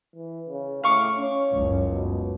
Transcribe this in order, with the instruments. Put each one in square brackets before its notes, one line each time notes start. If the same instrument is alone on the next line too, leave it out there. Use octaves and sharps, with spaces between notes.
[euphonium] E3
C#3
[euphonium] A2 [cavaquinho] F5 C#6 D6
[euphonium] C#4
[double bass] F#1 C#2
[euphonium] B2